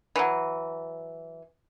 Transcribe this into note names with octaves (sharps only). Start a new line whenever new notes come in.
E3 F#3